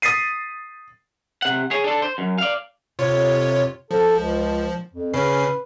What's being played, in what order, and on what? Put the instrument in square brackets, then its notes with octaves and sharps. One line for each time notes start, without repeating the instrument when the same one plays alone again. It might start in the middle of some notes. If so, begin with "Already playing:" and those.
[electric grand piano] D#6 A6 B6 C7 D#7
[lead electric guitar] C3 F#5
G#4 C#5
D4 A4
C5
F#2
D5 F5
[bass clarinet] F2 [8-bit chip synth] C3 F4 C#5
[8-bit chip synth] F3 [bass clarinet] A4
[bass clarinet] C#2
F2
[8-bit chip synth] C#3 C#4 C7 [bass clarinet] B4